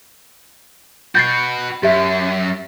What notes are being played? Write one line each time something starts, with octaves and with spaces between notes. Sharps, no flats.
F#4 B4 G6 A6 C7
F#2 G4 E5